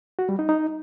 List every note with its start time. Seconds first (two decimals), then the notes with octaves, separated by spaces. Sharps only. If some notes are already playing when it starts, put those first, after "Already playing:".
0.19 F#4
0.29 G3
0.39 D#4
0.49 D#4